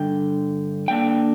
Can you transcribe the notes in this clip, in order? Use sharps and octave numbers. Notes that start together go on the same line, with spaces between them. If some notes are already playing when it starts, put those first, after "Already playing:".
Already playing: G2 D3 G5
D3 A#3 D4 G5